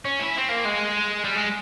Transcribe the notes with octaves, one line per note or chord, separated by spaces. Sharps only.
C#4
E4
C4
A#3
G#3
G3
G#3